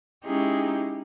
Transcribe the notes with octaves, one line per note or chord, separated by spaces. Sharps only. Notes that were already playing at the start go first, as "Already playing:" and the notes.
G#3 C#4 D#4 E4 G4 G#4